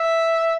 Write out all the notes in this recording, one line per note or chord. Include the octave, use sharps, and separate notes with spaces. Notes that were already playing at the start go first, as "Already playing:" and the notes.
Already playing: E5